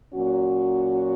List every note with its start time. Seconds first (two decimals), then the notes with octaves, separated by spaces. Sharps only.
0.14 A#2 F#3 C#4 F#4